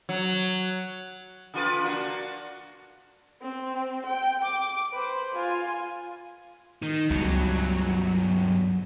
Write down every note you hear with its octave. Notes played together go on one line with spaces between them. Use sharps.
F#3
C#3 F4 B4
A#3 D4 F#4
C4
G5
D6
B4 C5
F4 G#5
D#3 D#4
C#2 G2 B2 F#3